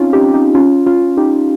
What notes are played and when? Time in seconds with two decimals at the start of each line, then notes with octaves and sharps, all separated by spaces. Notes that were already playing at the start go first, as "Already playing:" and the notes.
Already playing: C4 C#4 D#4 F4
0.13 D#4 G4
0.34 D#4 G4
0.55 C#4 F4
0.86 C#4 F4
1.17 D#4 G4